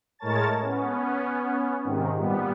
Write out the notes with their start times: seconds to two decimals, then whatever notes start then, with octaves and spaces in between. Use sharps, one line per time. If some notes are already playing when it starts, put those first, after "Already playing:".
0.19 A2 G#3 A#4 C#5 A5 A6
0.61 B3 C#4
1.84 G#2 C3 D#3
2.15 A#2 G3 B3